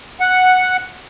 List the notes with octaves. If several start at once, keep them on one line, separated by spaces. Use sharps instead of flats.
F#5